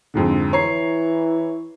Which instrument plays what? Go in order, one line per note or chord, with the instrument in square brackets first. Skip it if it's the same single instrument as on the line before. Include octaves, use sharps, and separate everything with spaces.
[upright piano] F2 G#2 D3
[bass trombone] E3 [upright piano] C#5 A#5 C7